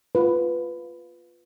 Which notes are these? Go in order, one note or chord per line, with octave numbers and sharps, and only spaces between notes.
F4 B4